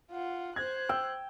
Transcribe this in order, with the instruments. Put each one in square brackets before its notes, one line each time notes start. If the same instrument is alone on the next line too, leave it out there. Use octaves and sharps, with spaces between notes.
[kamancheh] F4 F#5
[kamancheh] C5 F#6 [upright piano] G#6
[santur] G5 [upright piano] E6